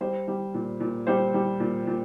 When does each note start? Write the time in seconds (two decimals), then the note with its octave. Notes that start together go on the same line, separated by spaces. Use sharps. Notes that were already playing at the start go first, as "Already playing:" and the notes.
0.01 G3 C5
0.28 G3
0.54 A#2
0.80 A#2
1.07 G3 C5
1.34 G3
1.60 A#2
1.87 A#2